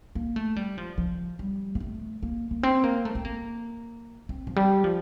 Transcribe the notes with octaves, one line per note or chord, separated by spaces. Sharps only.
A#3
A3
G3
F3
F3
G3
A#3
A3
A#3
A#3
C4
A#3
A3
C4
A#3
C4
F3
G3
F3